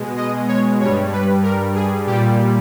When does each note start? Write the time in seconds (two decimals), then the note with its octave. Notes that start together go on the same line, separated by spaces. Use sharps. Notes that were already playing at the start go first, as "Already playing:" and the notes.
Already playing: B2 G#3
0.17 D#5
0.48 C#5
0.80 G2 G3 C#5
1.12 B4
1.43 A#4
1.75 G#4
2.07 A#2 G3 G4